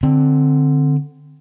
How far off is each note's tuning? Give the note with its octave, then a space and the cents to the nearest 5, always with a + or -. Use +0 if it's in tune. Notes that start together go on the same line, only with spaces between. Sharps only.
D3 +10 C4 +0